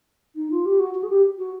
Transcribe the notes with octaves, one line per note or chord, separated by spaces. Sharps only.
D#4
F4
G4
F#4
F#4
G#4
G4
F#4